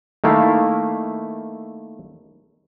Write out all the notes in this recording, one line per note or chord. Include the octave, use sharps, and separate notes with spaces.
D#3 A3 A#3 E4 F5